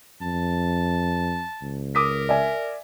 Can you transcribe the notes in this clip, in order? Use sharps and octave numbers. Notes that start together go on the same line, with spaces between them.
F2 A5
C#2
A#4 D6 D#6 B6
D5 E5 G#5